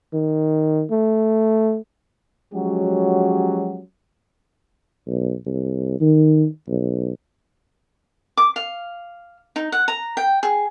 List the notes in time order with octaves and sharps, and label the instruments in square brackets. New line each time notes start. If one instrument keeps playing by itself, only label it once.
[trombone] D#3
A3
[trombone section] F3 F#3 G#3 C#4 F#4 G4
[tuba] B1
C2
D#3
B1
[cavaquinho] D6
F5
D#4
F#5
A#5
G5
G#4